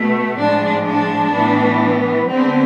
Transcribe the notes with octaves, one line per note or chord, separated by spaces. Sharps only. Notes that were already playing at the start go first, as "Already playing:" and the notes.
Already playing: B2 A3
A2 F3 G#3 D4
D4
A2 E3 B3
D3 G#3 B3 C4